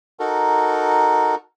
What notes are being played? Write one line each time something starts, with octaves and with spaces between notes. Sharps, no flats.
D#4 F#4 A4 A#4